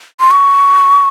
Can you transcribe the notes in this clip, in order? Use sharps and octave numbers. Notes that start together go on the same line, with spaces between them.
C6
C#6